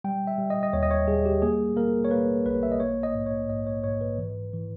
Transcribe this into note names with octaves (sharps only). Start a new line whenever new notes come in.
G3 G5
E5
G3
D#5
D#5
D#2 C#5
D#5
C#5
G3 G#4
G4
A#3 G#4
A#3 A#4
C#5
A#3 B4
A#1 B4
E5
D#5
A#3 C#5
D#5
G#2
C#5
G#2 D#5
C#5
G#2 C#5
B4
E3
E3